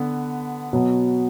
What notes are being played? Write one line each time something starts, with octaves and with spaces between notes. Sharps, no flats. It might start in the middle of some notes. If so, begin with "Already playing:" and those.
Already playing: D3 B3
B2 F#3 B3